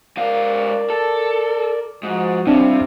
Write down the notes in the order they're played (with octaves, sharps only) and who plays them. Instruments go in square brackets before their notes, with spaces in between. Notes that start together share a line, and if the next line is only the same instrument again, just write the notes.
[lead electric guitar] G#2 F5 [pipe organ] A#4 D5
[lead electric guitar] A4
[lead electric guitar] G#2 [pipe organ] F3 F#4
[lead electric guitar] C3 [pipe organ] G3 E4 F5 [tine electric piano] C4 D4